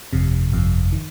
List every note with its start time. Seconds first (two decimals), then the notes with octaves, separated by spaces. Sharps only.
0.13 G1 F2 C3
0.52 G1 F2 C3
0.92 D#3